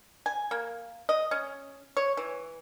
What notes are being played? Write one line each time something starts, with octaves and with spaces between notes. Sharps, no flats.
G#5
A#3
D#5
C#4
C#5
E3